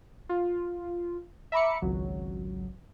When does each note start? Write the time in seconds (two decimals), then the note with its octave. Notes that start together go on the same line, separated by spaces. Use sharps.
0.29 F4
1.52 E5 A#5 B5 D6 C#7
1.82 G#1 C#2 F#3